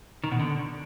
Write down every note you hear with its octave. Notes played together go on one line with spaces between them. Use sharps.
D#3
B2
D3